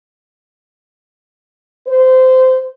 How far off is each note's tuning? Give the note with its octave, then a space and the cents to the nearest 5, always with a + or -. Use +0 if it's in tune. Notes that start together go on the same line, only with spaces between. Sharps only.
C5 -20